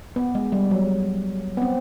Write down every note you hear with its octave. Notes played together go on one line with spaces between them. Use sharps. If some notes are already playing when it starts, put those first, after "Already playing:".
B3
G#3
G3
F#3
B3
C4